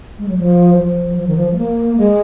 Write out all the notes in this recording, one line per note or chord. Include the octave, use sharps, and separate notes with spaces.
G#3
F#3
F3
F3
F3
D#3
F3
G#3
A#3
G#3